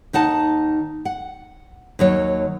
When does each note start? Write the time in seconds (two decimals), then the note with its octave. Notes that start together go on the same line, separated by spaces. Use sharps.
0.13 D#2 D#4 F#5 A5
1.05 F#5
1.99 D#2 F#3 C#5